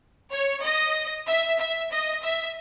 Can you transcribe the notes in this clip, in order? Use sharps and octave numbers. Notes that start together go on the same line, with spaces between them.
C#5
D#5
E5
E5
D#5
E5